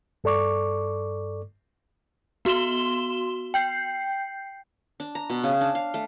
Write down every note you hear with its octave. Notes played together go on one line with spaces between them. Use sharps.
G2 A4 D5 C#6 D6
B3 F#4 C6 E7 G7
G5 G6 C7
D4
A#5
B2
C#3
D4
F5
A3